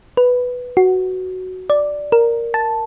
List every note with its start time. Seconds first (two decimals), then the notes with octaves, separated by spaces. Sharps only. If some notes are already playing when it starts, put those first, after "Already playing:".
0.17 B4
0.77 F#4
1.70 D5
2.12 A#4
2.54 A5